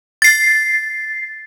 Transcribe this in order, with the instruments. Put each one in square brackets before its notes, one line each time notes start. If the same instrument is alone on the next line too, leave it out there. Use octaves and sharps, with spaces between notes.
[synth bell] A6 C7